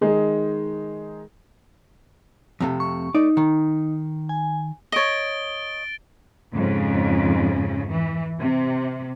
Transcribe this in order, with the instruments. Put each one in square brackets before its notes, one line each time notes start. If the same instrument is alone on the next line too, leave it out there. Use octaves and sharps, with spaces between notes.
[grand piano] D#3 G#3 D#4 G#4
[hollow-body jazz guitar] F2 C3 A3
[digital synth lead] C#6
[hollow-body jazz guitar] A3 D5 [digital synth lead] D#4
[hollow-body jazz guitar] D#3
[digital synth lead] G#5
[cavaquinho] C#5 D#5 [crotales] A6 D7 G7
[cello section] F2 G#2 C#3
E3
C3